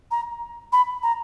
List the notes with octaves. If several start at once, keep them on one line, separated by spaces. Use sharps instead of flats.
A#5
B5
A#5